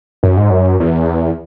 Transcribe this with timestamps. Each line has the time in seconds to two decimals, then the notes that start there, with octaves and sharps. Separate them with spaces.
0.23 F#2
0.37 G#2
0.50 F#2
0.80 E2